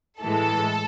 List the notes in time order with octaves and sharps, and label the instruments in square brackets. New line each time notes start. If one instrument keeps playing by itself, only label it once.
[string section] A2 E3 G#3 A4